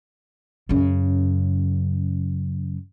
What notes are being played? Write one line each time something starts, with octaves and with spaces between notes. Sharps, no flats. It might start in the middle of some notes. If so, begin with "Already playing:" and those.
F#2 C#3